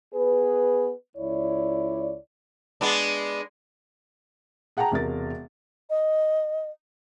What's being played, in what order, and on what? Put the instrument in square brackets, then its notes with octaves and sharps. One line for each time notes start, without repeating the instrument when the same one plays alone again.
[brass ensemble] B3 G#4 B4
C#2 E4 C#5 D5
[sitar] G#3 B3 D4
[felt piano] G#4 F#5 G5 A5 A#5
E1 C3 A#4 A6
[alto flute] D#5